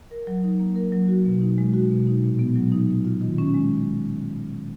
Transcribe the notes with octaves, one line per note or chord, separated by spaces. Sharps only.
A#4
F#3
D#4
A#3
A#4
F#3
F#4
B2
D#4
G#3
F#4
B2
D#4
A#2
B3
F#3
D#4
A#2
F4
D#3
C#4
G#3